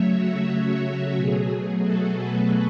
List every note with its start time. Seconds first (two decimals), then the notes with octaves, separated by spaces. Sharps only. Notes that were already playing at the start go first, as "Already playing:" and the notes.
Already playing: C#3 F#3 A3 C#5 E5
0.14 F#4
1.16 B2 F#3 A3 G#4
1.84 F#4 A4
2.17 G#4 B4